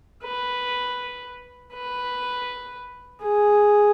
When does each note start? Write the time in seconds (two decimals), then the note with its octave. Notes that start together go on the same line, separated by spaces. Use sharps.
0.24 B4
1.73 B4
3.22 G#4